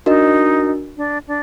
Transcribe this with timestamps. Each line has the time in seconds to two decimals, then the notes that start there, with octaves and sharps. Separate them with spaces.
0.06 D4 D#4 F#4 A#4 D#5
0.97 D4
1.28 D4